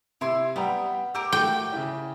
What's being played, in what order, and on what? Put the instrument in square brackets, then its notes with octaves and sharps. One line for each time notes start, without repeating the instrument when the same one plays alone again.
[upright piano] C3 [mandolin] E4 C6
[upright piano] G3 G5 A#5 [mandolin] B3
[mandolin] G4 A#4 D6 [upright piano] E6
[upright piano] A3 F#4 [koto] G5
[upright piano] C#3 E4